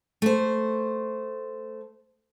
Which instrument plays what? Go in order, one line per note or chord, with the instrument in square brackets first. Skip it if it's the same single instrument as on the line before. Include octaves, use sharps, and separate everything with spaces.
[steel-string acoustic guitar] A3 C5